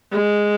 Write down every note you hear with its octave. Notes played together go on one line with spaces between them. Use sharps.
G#3